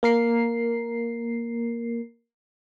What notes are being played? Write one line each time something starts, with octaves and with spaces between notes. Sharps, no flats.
A#3 A#4 C7